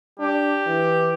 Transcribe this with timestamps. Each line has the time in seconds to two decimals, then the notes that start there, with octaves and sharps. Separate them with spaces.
0.19 D4 G4
0.67 E3